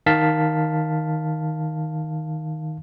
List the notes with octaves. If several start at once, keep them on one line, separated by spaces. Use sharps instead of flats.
D#3 F5 A5 B6